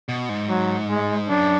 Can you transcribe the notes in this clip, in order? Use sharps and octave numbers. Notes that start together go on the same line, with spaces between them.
B2
G#2
F#3
G#3
F#2 D4